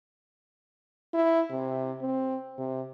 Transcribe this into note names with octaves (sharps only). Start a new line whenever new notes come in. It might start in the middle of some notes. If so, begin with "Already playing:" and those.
E4
C3
C4
C3